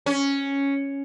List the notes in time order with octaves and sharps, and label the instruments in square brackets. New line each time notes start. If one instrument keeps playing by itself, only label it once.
[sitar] C#4